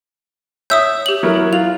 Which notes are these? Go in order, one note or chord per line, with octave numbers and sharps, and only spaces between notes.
C#5 E5 D#6 E6 G6
G4 F#7
F#3 E4 A#4
F4 F7